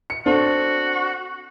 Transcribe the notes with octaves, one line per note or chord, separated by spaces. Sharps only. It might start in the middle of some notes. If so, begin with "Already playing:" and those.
C#7
C4 D4 F#4 A4